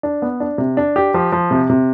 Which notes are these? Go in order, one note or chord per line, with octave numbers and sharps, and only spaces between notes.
D4
B3
D4
C3
D4
G4
F3
F3
C3
C3